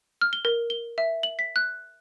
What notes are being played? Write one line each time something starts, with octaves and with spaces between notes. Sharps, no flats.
F6
G7
A#4
G7
E5
F#7
B6
F#6